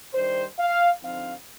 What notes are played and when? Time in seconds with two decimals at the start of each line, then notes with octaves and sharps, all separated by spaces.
0.13 D#3 G3 D4 C5
0.58 F5
1.02 D3 F3 C4 D#4 F5